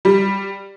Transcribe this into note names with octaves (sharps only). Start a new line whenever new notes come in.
G3